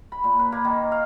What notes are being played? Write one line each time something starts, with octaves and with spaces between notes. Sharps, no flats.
B5
A#2
B4
A#3
D#3
F5